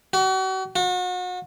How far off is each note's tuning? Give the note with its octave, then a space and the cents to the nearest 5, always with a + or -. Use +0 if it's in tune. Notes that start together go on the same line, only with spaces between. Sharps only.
F#4 +40
F#4 -35